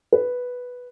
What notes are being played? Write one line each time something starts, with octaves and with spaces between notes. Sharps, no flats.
B4